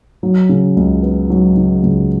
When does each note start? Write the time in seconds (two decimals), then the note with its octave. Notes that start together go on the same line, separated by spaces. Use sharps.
0.23 F#3
0.49 C#3
0.77 C#2
1.03 B3
1.30 F#3
1.57 C#3
1.83 C#2